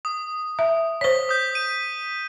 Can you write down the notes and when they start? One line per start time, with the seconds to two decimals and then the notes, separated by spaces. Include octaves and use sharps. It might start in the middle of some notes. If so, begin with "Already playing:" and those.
0.05 D#6
0.59 E5
1.01 C5 C#5 B6 G7
1.29 D#6 G6
1.55 D#7